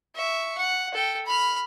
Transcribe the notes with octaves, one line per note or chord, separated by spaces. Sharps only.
E5 C#6
F#5
A4 G5
B5 F6